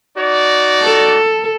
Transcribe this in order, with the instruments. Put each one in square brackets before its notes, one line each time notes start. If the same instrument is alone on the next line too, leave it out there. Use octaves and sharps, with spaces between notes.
[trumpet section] D#4 F#4 D5
[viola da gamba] A4